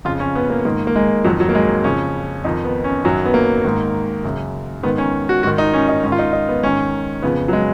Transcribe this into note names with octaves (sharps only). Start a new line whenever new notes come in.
F2 C#3 F4
C#4
B3
A#3
G#2 D#3 A#3
A#3
G#3
F2 D#3 F#3
F#3
A#3
G#3
F2 C#3 C#4
F2 D#3 D#4
B3
C#4
F#2 D#3 F#3
B3
A#3
G#2 D#3
F#2 C#3
G#2 D#3 B3
C#4
F#4
G#2 D#3 F#4
D#4
C#4
D#4
G#2 D#3 C#4
F4
D#4
D#4
B3
G#2 D#3 C#4
F2 C#3 B3
F#3
G#3